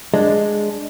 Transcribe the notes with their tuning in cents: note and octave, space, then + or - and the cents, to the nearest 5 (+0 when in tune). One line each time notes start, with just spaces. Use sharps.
G#3 +0 D4 +0